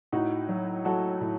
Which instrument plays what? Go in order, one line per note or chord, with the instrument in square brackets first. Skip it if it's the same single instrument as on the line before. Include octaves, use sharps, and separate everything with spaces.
[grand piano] A2 D#4 F#4
F#3
F#3 F#4 A4
A2